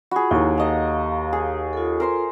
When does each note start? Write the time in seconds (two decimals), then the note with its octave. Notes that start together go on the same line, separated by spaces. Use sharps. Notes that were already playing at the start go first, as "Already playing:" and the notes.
0.11 F4 F#4 G#4 B5
0.31 D#2 E4 A#5
0.58 A4 D#5 F5 A#5
1.33 G#4
1.73 F4 A4
2.00 A#4 C5 C6